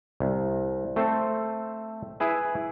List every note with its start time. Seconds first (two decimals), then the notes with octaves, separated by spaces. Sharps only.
0.20 C2
0.96 A3 C4 A4 C5
2.20 E4 G#4 B4